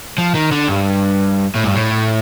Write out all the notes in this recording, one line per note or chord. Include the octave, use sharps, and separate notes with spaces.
F3
D#3
D3
G2
A2
G2
A2